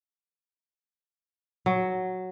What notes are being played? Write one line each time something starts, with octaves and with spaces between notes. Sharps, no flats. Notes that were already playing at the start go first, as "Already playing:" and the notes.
F#3